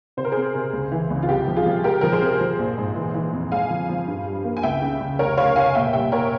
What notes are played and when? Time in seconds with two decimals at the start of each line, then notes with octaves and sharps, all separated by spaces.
0.17 C3 C5
0.25 A#4
0.32 C4 G#4 C5
0.55 C3
0.73 C#2
0.92 E3
1.10 C#2
1.23 F4
1.29 C2 G4
1.47 F3
1.56 F4 G#4
1.66 F3
1.84 G#3 G4 A#4
2.01 F3 A#4
2.12 G#4 C5
2.22 C3
2.40 F3
2.59 A#1
2.78 G#2
2.96 E3
3.15 E3
3.33 F2
3.52 G#3 F5 G#5
3.70 F3
3.89 F3
4.07 G2
4.26 G3
4.44 A#3
4.57 G#5
4.63 C#2 E5 G5
4.82 C#3
5.00 C#2
5.19 F1 A#4 C#5
5.37 F1 C#5 F5
5.56 F1 F5 G#5
5.75 A#2 E5 G5
5.93 G3 E5 G5
6.12 A#3 A#4 C#5